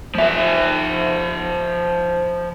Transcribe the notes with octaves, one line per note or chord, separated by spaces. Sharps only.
F3 E5